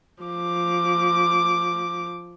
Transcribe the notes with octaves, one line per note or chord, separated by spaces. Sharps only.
F3 D6